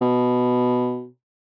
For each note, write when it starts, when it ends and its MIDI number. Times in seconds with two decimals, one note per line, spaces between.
0.01 1.06 47